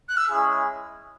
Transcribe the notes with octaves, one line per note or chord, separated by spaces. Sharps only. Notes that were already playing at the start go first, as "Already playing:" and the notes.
F#6
E6
G#3 C#4 E4 G#4